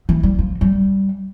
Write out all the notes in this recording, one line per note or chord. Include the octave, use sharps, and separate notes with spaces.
E3
G3
F3
G3